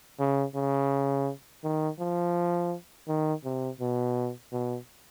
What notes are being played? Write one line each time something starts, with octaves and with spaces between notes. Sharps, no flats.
C#3
C#3
D#3
F3
D#3
C3
B2
B2